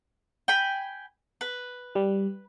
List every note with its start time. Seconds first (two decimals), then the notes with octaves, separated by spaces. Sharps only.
0.48 G5 G#5 B5
1.41 B4
1.95 G3